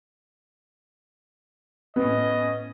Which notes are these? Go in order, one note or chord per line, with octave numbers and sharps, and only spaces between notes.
A2 B3 C#4 D#5